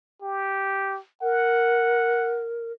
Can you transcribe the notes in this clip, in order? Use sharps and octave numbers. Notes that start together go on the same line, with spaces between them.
G4
A#4 F#5